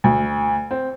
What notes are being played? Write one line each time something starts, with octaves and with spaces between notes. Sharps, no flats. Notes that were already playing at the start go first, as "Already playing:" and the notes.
D2
C4